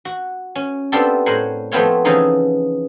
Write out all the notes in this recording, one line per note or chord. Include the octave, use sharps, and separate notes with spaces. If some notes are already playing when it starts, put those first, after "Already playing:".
F#4
C#4
B3 C4 D4 F4 G4 A4
A2 A#4 C5 F#5 G#5
F3 A3 B3 C4 F4 C#5
C#3 E3 F3 D#4 E4 G#4